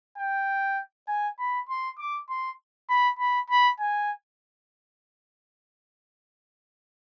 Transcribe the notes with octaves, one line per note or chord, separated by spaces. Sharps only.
G5
G#5
B5
C6
D6
C6
B5
B5
B5
G#5